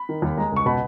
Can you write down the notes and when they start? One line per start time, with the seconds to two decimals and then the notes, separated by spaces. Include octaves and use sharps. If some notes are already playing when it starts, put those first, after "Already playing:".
Already playing: B5
0.09 D#3
0.22 D#2
0.37 G#3 A#5
0.52 C#2 C#6
0.66 B2 B5